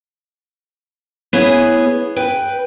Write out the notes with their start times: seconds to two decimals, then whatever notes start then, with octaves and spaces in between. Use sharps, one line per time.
1.33 B3 E4 G#4 C#5
2.16 B4 G5